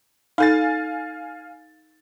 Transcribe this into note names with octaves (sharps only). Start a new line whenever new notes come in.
D#4 A4 F5 G#5 A6